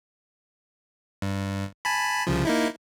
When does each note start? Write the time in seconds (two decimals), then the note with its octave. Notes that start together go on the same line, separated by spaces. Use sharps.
1.22 G2
1.85 G#5 A5 B5
2.27 C2 C#3 F3
2.45 A#3 D#4 E4